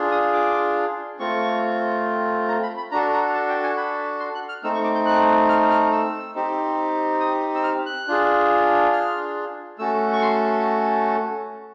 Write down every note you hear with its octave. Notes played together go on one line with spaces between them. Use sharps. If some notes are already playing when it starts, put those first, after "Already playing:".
Already playing: D4 F4 G#4
D#6
D6
A3 C4 F4 C#6
A#5
B5
B5
D4 F#4 A4 A#5
A#5
A5
G5
G#5
B5
C6
F#6
F6
A3 C4 D#4 E6
C#6
D6
G6
F#6
F6
F6
E6
C4 D#4 G4
D#6
E6
F6
F#6
D4 F4 G#4
F6
A3 C#4 F#4 A4 E6
C#6
C6